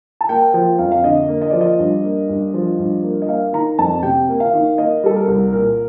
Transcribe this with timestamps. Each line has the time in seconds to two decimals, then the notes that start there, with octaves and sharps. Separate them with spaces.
0.21 A5
0.29 A#3 G5
0.54 F3 G5
0.79 F2 F5
0.92 F5
1.04 D3 D#5
1.28 A#3
1.42 D#5
1.51 F3 D5
1.61 D#5
1.79 G2
2.04 A#3
2.29 G2
2.54 F3
2.79 G2
3.03 A#3
3.22 D#5
3.28 A#3 F5
3.53 D#3 A#5
3.79 F2 A5
4.03 C3 G5
4.29 A#3
4.40 F5
4.53 D#3
4.78 A#3 D#5
5.04 G3 A4
5.16 A#4
5.27 C2
5.53 A#2 A#4